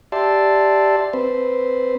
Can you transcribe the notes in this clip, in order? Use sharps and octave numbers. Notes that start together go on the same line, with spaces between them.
G4 D5 E5 A5 C6
C4 B4 C5